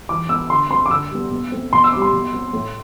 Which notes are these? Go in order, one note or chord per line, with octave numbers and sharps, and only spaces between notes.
E3 D6
B3 E6
D3 C6
A3 C4 C6
D6
D3 E6
G3 B3
B2
A3 C4
B2 C6
E6
C4 D6
G3 C6
B2
F#3 C4
A2